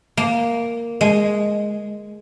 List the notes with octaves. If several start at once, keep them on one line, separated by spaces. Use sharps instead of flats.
A#3
G#3